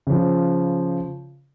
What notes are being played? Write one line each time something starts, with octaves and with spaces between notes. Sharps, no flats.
C#3 F3